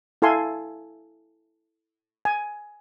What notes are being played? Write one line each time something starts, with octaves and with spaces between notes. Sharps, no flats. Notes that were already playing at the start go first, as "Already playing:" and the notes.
E4 A4 F5 G#5 C6
G#5